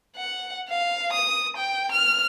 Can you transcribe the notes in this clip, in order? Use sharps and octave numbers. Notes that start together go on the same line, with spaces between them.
F#5
F5
D#6
G5
F6